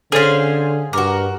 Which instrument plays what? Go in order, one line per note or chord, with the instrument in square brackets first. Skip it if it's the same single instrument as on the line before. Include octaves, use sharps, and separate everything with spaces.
[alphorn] D3 [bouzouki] C#4 C5 [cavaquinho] G#4 F5 [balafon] A4 C#5
[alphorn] G2 [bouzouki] F#4 A#4 [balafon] D6